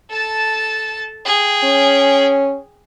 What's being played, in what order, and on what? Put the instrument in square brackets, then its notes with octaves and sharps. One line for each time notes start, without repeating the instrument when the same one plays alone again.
[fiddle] A4 A5
G#4 G5
[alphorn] C#4